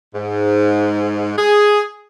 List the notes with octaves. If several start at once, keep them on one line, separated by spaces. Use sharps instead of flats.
G#2
G#4